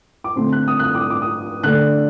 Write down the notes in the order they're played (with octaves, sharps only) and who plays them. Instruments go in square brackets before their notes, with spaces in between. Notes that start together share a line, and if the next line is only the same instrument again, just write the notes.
[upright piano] D6
D3 A3 C4 C6
F#6
D#6
F#6
D#6
D6
D#6
D6
D#6
D3 A3 D4 F#6